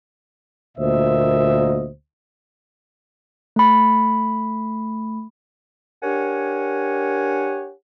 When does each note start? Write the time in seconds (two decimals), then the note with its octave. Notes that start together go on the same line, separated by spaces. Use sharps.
0.78 D2 A#2 A#3 C5 D#5 E5
3.56 A3 B5
6.02 D4 G4 A#4 C#5 F#5 G#5